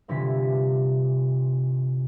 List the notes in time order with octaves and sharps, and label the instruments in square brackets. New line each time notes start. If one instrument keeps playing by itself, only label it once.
[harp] G1 C3 E3 F4 B6